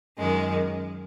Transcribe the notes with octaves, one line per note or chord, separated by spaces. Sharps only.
F#2 D#3 G#3